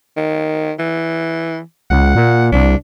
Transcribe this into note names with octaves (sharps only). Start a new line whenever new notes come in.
D#3
E3
C#2 F#5
A#2
C2 D4